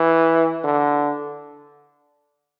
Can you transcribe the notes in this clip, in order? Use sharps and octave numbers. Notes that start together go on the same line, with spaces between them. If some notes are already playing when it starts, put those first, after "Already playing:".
Already playing: E3
D3